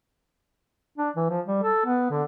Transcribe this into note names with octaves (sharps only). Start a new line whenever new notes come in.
D4
E3
F3
G3
A4
B3
D3